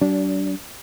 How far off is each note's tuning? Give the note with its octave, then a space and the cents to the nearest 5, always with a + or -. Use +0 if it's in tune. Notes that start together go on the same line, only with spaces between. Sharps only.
G3 -45 D4 -25